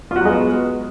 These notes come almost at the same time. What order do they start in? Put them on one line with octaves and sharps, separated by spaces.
F4 F#4 F#3 G#3 B3